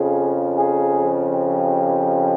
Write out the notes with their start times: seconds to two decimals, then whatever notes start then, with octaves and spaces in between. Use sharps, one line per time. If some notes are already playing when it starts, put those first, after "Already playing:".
Already playing: F2 C#3 F3 G#4
0.55 G#4
1.31 G4